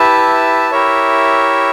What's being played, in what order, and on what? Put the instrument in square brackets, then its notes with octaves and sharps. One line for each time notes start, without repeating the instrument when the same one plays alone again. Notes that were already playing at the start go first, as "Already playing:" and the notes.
Already playing: [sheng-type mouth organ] E4 G4 B4 E5 A5
E4 G4 A#4 C#5 E5